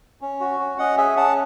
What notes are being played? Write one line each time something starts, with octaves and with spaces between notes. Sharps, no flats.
C#4
F#4
C#4
C#4 D#5 F#5
G#4 E5 G#5
C#4 F#5 A5